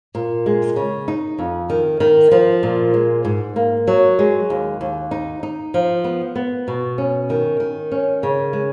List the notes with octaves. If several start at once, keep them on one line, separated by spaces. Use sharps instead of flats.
A#2
G#3
C#3
D#4
F2
D#3
D#3
F3
A#2
G#3
G#2
A#3
F#3
G#3
D#2
D#2
D#4
D#4
F3
B3
B3
B2
C#4
D#3
D#3
C#4
C#3
G#3